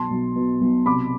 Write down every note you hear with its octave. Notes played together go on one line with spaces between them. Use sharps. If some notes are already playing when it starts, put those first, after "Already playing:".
Already playing: B1 A5 C6
B1
B2
B1
C3 B5 D6